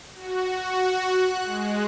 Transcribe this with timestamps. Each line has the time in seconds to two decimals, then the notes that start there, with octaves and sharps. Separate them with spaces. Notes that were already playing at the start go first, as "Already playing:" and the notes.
0.15 F#4
0.49 F#4
1.10 F#6
1.44 G#3